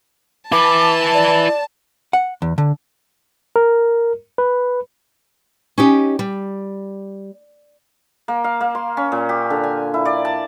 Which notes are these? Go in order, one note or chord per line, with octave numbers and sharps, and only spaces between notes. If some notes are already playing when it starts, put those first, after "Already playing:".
E4 B4 A5 D6
D5
F#5
E2
D3
A#4
B4
C#4 D#4 G4
G3
A#3
F5
A#3
C6
C#4
A#2
G4
D3
G#5
E4
D5
A5